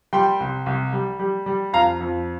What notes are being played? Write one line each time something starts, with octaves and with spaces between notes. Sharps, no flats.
G3 G5 C6
C2
C2
G3
G3
G3
F2 F5 A#5
F2